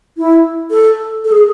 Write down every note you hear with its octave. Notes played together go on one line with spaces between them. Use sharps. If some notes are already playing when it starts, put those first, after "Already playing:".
E4
A4
A4
G#4